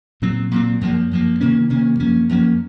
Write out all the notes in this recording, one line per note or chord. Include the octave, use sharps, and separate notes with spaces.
A#2 F#3 C4
A#2 F#3 C4
F#2 F3 A#3
F#2 F3 A#3
C3 D#3 A#3 C#4
C3 D#3 A#3 C#4
F#2 F3 A#3 C#4
F#2 F3 A#3 C#4